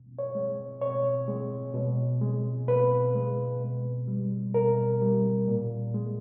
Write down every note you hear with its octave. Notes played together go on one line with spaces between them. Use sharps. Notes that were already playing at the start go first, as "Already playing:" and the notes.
Already playing: B2
C#5
G#3
B2 C#5
G#3
B2
G#3
B2 B4
G#3
B2
G3
B2 A#4
G3
A#2
G#3